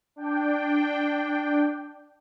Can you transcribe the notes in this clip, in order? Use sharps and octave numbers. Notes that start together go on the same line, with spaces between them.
D4 G5